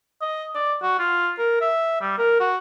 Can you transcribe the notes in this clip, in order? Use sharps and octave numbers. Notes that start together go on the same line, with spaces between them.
D#5
D5
F#4
F4
A#4
E5
G3
A#4
F#4